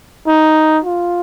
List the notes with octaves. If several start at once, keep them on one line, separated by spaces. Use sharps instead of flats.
D#4
F4